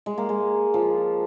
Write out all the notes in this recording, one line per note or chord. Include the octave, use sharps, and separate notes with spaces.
G#3
A#3
G#3
F3